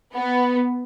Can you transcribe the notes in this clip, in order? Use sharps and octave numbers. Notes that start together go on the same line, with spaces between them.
B3